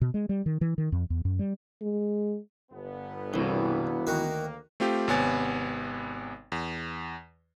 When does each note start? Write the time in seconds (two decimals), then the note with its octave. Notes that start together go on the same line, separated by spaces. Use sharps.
0.01 B2
0.14 G#3
0.29 G3
0.46 D#3
0.61 E3
0.78 D#3
0.92 F2
1.10 E2
1.25 F#2
1.39 G3
1.82 G#3
2.72 G1 B3
3.34 C2 B2 E3
4.07 D2 D#3 A#3 F#4
4.80 A3 C4 F4 G4
5.08 G#1 C3 B3 C#5 G#5 A6
6.52 E2